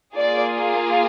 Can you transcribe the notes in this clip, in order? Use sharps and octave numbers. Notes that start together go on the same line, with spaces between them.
A#3 F4 G#4 D5